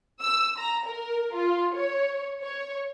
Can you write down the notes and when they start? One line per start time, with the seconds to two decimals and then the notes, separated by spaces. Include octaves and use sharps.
0.21 E6
0.58 A#5
0.87 A#4
1.34 F4
1.75 C#5
2.41 C#5